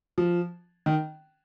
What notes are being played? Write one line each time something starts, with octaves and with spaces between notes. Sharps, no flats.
F3
D#3